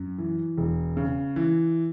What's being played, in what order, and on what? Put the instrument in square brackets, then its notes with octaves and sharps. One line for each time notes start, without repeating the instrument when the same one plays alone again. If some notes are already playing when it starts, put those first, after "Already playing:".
Already playing: [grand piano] F#2
E3
E1
C#3
E3